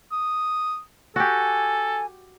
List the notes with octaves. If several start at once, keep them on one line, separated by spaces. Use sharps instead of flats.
D#6
F#4 G4 A4 G#5